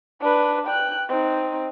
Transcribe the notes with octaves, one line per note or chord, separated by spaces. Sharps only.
D4 B4
G5 F#6
C4 D#4